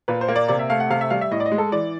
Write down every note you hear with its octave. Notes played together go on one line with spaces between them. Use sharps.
A#2 B4
C5
A#3
D5
C3 D5
E5
A3 F5
F#5
C3 F5
E5
G3 F5
E5
A2 D#5
D5
D#5
G#3
A4
E3 D5